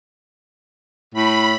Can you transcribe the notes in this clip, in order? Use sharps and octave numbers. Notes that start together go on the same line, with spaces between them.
A2 B5